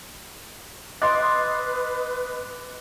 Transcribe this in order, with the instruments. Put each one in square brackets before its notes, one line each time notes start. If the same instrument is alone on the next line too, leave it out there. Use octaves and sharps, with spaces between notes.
[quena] B4 [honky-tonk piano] D#5 C6 [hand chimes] D6 F#6 A6